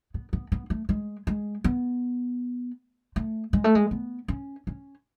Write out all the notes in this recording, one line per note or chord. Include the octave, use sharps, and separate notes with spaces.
B3
B3
B3
A3
G#3
G#3
B3
A3
G#3
A3
G#3
B3
C#4
C#4